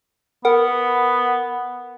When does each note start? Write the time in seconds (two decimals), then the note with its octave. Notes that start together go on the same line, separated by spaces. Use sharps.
0.45 B3 A#4 F#5